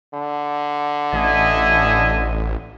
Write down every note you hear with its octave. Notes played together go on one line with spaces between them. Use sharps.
D3
A1 D#5 E5 G#5